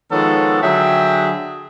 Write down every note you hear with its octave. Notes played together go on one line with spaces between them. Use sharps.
D#3 F3 G#3 B3 A4 C#5
D3 F#3 G#4 E5 G5